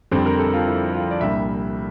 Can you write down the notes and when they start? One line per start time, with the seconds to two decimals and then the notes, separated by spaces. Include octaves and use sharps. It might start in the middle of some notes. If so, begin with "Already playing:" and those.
0.12 F2 D3 G3 C4 C5
0.26 A#4
0.39 A4
0.53 F4
0.67 E4
0.94 F4
1.11 D5
1.21 C2 A#2 G3 D4 E5